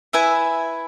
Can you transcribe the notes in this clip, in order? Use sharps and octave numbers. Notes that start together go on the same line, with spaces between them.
E4 B4 E5 G#5